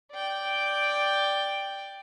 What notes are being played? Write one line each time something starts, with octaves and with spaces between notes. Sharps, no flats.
D5 G5